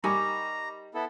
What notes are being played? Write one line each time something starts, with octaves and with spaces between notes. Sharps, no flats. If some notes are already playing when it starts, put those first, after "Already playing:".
G3 D#4 A#4 G#5 A#5 C#6 D6
B3 E4 A4